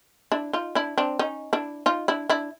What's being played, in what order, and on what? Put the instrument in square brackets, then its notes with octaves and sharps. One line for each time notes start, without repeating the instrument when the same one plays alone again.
[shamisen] D4 E4
D#4 F4
D4 E4
C4 D4
C#4 D#4
D4 E4
D#4 F4
D4 E4
D4 E4